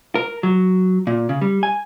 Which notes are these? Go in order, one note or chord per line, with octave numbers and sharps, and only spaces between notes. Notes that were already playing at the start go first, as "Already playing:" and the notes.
A#4
F#3
A#2
C#3
G3
G#5